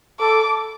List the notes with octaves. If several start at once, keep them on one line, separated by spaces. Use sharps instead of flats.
A4 D6